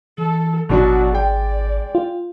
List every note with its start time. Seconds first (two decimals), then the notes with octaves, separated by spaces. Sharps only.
0.18 E3 A4
0.69 G#1 B2 F#3 D4 F#4 D5
1.12 G#3 D5 G5
1.95 F4